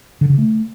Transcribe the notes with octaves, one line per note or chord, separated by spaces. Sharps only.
D3
C#3
A3